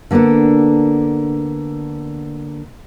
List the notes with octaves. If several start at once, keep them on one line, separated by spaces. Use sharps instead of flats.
D3 A#3 B3 D4 A4